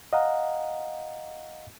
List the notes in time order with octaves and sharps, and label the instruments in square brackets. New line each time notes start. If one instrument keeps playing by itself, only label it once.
[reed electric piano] D#5 F5 F#5 A#5